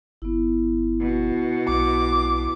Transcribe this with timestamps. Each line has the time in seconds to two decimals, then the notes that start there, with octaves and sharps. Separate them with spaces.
0.22 G1 B3 E4
0.99 B2
1.68 B1 E4 D6